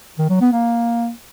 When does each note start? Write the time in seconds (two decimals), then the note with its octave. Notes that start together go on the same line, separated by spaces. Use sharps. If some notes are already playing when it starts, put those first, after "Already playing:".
0.18 D#3
0.29 F#3
0.41 B3
0.52 A#3